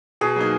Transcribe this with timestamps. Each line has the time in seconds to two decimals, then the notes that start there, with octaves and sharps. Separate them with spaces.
0.21 B2 G#4
0.36 F#3 A#3 D#4